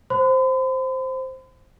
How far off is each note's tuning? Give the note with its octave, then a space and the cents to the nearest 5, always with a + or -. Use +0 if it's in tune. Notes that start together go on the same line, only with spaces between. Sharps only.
C5 +0 B5 +45